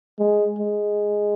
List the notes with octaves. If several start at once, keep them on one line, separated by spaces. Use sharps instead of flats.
G#3
G#3